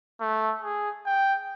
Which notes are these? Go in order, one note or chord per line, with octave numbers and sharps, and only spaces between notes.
A3
G#4
G5